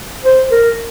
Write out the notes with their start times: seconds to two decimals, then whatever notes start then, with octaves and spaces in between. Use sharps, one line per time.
0.24 C5
0.51 A#4